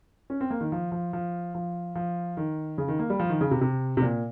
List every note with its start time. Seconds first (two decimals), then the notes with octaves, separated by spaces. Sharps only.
0.30 C#4
0.41 C4
0.50 A#3
0.61 D#3
0.72 F3
0.92 F3
1.13 F3
1.55 F3
1.95 F3
2.37 D#3
2.78 C#3
2.88 D#3
2.99 A#3
3.10 G3
3.20 F3
3.29 D#3
3.41 C#3
3.51 C3
3.61 C3
3.97 C3
4.02 A#2